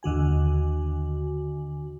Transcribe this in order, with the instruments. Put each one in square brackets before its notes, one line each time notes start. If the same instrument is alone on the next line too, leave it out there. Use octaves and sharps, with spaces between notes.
[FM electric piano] D#2 D3 F#4 G#5